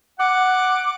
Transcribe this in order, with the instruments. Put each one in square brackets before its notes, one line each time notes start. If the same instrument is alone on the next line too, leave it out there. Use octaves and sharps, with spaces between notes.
[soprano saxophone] F#5 [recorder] D6